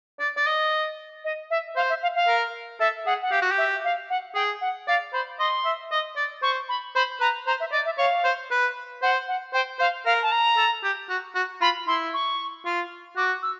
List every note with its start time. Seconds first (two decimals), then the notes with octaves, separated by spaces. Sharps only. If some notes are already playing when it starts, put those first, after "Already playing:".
0.20 D5
0.37 D5
0.47 D#5
1.24 D#5
1.50 E5
1.76 C5 F5
1.89 E5
2.02 F5
2.15 F5
2.27 A#4
2.80 A4 E5
3.06 G#4 F#5
3.21 F#5
3.31 G4 F5
3.42 F#4
3.51 G4
3.57 E5
3.84 F5
4.09 F#5
4.35 G#4 G5
4.61 F#5
4.87 D5 F5
5.13 C5 B5
5.39 D#5 C6
5.65 E5
5.91 D#5
6.16 D5
6.42 C5 C#6
6.68 B5
6.95 C5 B5
7.20 B4 A#5
7.47 C5 A#5
7.60 E5
7.72 D5 D#5
7.85 E5
7.98 C#5 F5
8.24 C5
8.51 B4
9.02 C5 F#5
9.28 F#5
9.53 C5 G5
9.79 C5 F5
10.05 A#4 F5
10.22 A5
10.31 A#5
10.57 A4
10.84 G4
11.09 F#4
11.35 F#4
11.61 F4 B5
11.87 E4 C6
12.13 C#6
12.65 F4
13.16 F#4 D6
13.42 E6